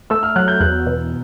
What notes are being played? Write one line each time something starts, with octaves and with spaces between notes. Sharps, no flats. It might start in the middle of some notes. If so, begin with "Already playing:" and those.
A3 E6
F6
F#3 F#6
G6
E2 F#6
B2